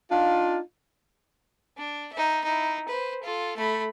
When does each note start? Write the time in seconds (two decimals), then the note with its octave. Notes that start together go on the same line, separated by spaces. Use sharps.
0.11 D4 D#4 F4
1.77 D4
2.13 D#4 E5
2.44 D#4 E4
2.88 B4 C5
3.23 F4 A4
3.57 A3 B5